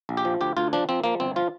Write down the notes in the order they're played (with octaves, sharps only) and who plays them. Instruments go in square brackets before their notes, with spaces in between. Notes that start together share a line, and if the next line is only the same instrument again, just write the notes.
[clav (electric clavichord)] A#1
G4
F3
D2 G4
D2 F4
F3 D4
F3 C4
F3 A#3
G1 C4
F3 F4